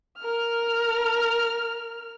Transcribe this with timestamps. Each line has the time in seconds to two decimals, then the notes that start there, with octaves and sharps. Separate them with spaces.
0.18 A#4 F6